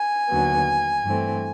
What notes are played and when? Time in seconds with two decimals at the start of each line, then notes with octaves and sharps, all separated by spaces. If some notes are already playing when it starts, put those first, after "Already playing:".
Already playing: G#5
0.27 D#2 D3 F#3 B3
1.03 G2 E3 A3 C4